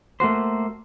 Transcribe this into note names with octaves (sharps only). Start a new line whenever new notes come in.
A3 A#3 F#4 C5